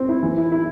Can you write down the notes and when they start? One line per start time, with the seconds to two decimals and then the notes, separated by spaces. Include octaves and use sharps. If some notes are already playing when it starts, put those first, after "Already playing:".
Already playing: C4
0.09 E4
0.23 E3
0.37 E4
0.52 E4